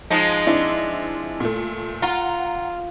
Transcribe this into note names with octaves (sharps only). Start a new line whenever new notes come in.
F3 G#3 D#4
C4 D4 E4
A#2 A3
F4 F#5 A#5